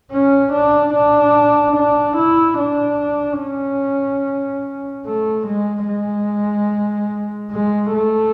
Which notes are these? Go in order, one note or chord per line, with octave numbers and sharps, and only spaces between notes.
C#4
D4
D4
D4
E4
D4
C#4
A3
G#3
G#3
G#3
A3